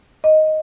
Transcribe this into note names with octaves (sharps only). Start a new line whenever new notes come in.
D#5